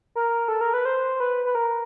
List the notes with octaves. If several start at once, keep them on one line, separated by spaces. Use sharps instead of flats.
A#4
A4
A#4
B4
C5
B4
B4
A#4